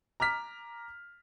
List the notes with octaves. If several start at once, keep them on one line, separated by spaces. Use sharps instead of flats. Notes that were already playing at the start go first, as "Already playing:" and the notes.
A#5 D6 F6 B6